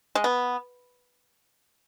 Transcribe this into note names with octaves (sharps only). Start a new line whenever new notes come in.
G#3
B3